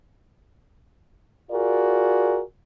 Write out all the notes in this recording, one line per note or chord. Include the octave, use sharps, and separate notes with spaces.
F4 F#4 G#4 A#4 D5